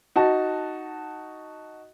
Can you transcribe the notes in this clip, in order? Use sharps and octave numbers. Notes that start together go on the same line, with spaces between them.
D#4 F#4 A5